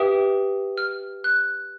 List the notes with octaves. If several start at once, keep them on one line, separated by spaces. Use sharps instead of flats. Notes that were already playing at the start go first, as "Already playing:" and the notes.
Already playing: G4 B4 E5 G5 D#6
F6
F#6